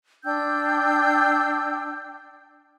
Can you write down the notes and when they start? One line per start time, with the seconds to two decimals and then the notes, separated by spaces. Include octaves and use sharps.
0.24 D4 G5 E6 G6